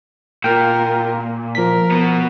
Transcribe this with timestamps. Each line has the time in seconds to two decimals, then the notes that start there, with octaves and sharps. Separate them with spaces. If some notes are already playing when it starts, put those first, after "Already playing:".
0.44 A#2 F4 A#4 G5 F6
1.17 A#3
1.55 F3 A#4 B6
1.91 B2 B3